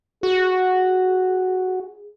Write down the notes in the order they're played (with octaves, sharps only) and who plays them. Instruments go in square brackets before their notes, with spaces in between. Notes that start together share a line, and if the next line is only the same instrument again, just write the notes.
[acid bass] F#4 [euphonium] G#4